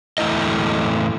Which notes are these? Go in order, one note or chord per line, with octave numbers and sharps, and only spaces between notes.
E2 A2 A3 E4 D#5